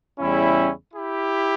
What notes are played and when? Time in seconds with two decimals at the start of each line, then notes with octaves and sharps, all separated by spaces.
0.18 E2 C#3 G3 C#4 E4
0.93 E4 G4